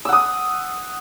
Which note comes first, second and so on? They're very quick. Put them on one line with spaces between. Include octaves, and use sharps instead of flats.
E6 F#5 D#6